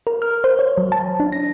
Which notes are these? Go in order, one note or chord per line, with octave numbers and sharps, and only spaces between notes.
A#4
F6
C5
C#5
F#3
A5
D4
A#6